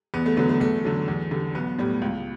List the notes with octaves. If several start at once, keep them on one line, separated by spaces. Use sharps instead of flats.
E2 B3
A3
D3 F#3 B3
A3
E2 A3
D3 F#3
E2
D3 G3
B1 B3
A2 G3
C#2